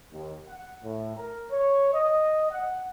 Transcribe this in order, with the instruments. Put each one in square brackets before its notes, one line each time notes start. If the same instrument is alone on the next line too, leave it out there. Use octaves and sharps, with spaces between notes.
[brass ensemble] D#2
F#5
A2
A#4
C#5
D#5
F#5